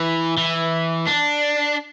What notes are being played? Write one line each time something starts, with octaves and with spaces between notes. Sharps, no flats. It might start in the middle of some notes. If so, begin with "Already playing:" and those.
Already playing: E3
E3
D4